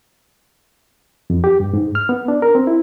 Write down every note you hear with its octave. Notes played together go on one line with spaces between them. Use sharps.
F2
G4
G2
G#2
F6
B3
D4
A#4
C4
E4